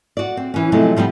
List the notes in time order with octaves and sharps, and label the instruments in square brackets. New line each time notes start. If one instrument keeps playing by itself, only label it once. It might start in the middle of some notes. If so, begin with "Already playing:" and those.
[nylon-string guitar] F#4 D5
C4
E3 C#4
C3 F3 F#3 G#3 A3
F3 G3 B3 C4